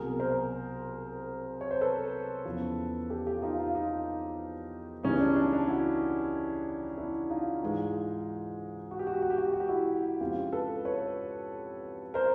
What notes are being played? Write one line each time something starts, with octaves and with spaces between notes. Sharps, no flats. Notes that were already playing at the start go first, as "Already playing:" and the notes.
Already playing: C2 B2 F#3 G#4 A#4
A#4 C5
C#5
C5
A4 B4
E2 C#3 F3
G4 A4
F4 G4
D#4 F4
D#4 F4
D#4 F4
C#2 C#3 E3 G3 C#4 D#4
D4
D4
D4
E4 F#4
D4 E4
D#4 F4
G#2 E3 G#3
F#4
G4
F#4
G4
F#4
G4
F#4
G4
F#4
G4
E4 F#4
F2 C#3 F3 G#3 F4 G4
A4 B4
B4 C#5
A#4 C5